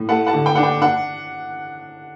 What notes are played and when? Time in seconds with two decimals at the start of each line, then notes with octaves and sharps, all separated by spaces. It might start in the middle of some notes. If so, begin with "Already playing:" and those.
Already playing: A2
0.09 A3 F#5 A5
0.27 F#5 A5
0.33 D3
0.46 G5
0.55 D4 F#5
0.63 G5
0.82 D4 F#5